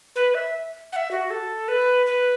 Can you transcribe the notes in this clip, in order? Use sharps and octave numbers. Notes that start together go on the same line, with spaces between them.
B4
E5
F#5
E5
F#4
A4
B4
B4